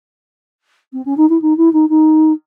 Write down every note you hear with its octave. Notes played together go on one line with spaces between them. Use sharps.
C4
C#4
D#4
E4
D#4
E4
D#4
D#4